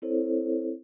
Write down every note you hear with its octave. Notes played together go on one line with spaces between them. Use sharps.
C4 E4 A4 C5 C#5